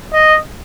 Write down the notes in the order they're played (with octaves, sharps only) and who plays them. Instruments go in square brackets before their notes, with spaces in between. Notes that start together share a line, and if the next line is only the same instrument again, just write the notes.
[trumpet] D#5